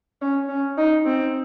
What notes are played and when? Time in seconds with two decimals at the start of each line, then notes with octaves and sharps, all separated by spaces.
0.22 C#4
0.49 C#4
0.77 D#4
1.05 C4